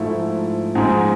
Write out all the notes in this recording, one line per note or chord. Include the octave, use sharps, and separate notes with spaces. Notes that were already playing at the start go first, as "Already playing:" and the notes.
Already playing: G#2 F3 A3 E4
G#2 F3 G#3